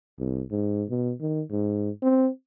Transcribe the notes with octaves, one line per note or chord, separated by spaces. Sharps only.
C2
G#2
B2
D#3
G#2
C4